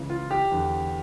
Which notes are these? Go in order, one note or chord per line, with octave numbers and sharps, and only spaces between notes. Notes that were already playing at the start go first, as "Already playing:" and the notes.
Already playing: C#2 C#3 E3
F4
G4
E2 D3